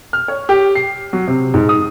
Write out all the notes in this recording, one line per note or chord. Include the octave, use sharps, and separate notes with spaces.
F6
C#5
G4
C7
F#3
C3
G#2
D#6